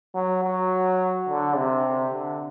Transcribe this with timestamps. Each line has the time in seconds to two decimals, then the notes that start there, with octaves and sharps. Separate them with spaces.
0.15 F#3
0.43 F#3
1.29 D3
1.56 C3
2.13 D3